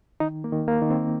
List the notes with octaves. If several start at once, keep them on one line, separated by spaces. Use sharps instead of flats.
D#3 D#4
A#3
D#3
A#3
D#3
C4